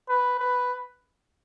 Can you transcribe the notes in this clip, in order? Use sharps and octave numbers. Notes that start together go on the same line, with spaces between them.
B4
B4